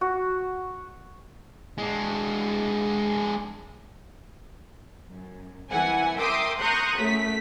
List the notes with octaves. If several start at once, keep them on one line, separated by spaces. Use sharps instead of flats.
F#4
G#3 D4
F#2
C2 E3 F#5 G#5
A#4 E5 G5 C6 D6 D#6
A#5 C6 C#6 D#6 F#6 G6
F#2 A3 B6